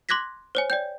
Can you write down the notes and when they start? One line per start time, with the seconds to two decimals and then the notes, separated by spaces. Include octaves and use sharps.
0.09 C6 D6 F#6 G#6 A#6 B6
0.55 C5 C#5 G#5
0.70 D5 G5 G6